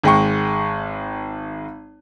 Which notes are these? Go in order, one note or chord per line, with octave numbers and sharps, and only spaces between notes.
G#1 G#3 G5 C#6